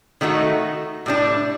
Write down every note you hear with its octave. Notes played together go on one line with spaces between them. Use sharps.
D#3 A3 D#4 F#4 A4
A2 G3 D4